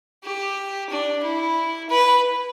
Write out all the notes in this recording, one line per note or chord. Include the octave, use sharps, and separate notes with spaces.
G4
D4
E4
B4